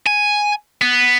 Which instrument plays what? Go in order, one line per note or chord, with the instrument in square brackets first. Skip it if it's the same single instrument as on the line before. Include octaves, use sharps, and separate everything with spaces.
[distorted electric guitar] G#5
B3